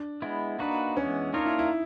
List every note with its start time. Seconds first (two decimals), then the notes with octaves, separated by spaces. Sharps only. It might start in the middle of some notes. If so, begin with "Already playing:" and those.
Already playing: D4
0.22 G#3 B3 E4
0.59 A#3 D4 D#4 F#4 B4
0.96 E3 G#3 B3 C#4
1.33 A#3 D4 D#4 F4 A#4 C#5
1.46 E4
1.59 E4